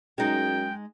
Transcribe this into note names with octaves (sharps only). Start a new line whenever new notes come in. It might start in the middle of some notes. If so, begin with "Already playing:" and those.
F#2 G#3 D#4 G5